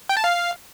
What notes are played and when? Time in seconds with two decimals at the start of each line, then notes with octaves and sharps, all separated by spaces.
0.09 G5
0.17 A5
0.24 F5